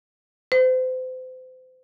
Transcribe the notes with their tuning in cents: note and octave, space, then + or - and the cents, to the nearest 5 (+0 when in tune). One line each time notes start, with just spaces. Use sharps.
C5 -35